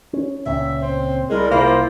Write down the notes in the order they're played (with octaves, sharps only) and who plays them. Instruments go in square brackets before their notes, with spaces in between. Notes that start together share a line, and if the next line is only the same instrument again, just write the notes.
[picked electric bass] C#4
[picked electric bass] C#2 A#2 C#4 [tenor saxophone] E5
[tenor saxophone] C4
[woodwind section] C2 G3 A#4 [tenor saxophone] G#3
[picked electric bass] C2 [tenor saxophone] A#3 [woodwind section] E4 F4 C5